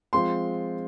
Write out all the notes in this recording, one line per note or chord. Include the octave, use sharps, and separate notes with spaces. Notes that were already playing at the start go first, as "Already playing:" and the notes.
F3 G#3 C4 F4 C6